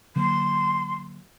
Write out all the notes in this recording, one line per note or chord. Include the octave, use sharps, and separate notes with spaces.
D3 F#3 A#3 C6